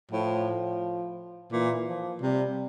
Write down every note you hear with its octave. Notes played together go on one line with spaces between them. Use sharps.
A2 F3
A#2 E3
F3
C3 G3